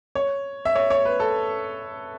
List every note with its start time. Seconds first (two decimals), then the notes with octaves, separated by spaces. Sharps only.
0.15 C#5
0.65 E5
0.75 C#5
0.90 C#5
1.05 B4
1.20 A4